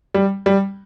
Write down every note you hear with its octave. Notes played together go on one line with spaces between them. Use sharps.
G3
G3